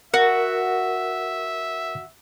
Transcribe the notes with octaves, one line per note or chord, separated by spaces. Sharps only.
F#4 A#4 E5